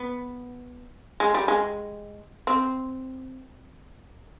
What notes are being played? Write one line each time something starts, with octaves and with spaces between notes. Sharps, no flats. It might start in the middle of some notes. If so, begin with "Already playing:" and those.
Already playing: B3
G#3
G3
G#3
C4